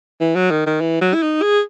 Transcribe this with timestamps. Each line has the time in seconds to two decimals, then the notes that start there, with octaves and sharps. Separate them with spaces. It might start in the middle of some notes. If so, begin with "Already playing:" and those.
0.21 E3
0.36 F#3
0.51 D#3
0.66 D#3
0.81 E3
1.01 F#3
1.14 E4
1.23 D#4
1.42 G#4